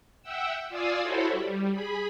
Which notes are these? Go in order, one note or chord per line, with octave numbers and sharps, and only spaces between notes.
E5 F#5 G5 E6
F4 D5 F5 G#5 D#6 E6
E4 F#4 A4 C5 C#5 B5
G3
G#4 B5